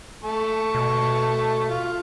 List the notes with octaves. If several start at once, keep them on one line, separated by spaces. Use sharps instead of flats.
A3 A5 C#6
B2
F4